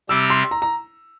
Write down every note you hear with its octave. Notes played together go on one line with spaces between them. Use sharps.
C3 G3 C4 G4 E6
C6
A#5
A#5